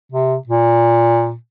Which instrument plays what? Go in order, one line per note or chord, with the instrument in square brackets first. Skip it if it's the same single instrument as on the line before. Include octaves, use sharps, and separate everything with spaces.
[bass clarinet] C3
A#2